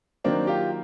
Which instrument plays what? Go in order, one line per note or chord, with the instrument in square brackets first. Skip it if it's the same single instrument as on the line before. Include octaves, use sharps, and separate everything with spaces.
[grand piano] D#3 F#3 A#3 [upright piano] C4 D4
[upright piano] F4 G4